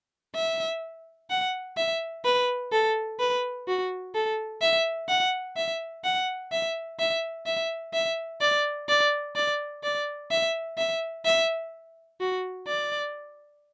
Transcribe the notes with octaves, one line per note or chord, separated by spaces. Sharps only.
E5
F#5
E5
B4
A4
B4
F#4
A4
E5
F#5
E5
F#5
E5
E5
E5
E5
D5
D5
D5
D5
E5
E5
E5
F#4
D5